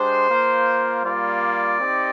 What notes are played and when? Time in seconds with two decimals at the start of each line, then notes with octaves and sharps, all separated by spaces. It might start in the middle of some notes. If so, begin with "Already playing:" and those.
Already playing: G#3 D4 G4 C5
0.27 A#3 F4
1.04 G3 A#3 F4 D5
1.81 C4 D#4 G4